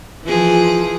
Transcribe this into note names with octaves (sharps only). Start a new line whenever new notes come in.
E3 F3 G#4